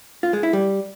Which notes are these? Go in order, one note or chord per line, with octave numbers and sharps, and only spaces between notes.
F4
G#3
E4
G3